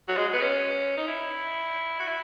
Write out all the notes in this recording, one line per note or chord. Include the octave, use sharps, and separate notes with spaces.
F#3
G#3
B3
C#4
D#4
E4
F#4
E4